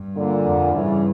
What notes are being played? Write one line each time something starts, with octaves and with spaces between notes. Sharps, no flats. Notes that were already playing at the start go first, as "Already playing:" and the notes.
Already playing: G2
A#2 D3
F2
G2 C#3 E3